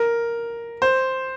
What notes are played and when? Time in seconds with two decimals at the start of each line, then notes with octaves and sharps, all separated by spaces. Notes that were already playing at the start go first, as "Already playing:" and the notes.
Already playing: A#4
0.82 C5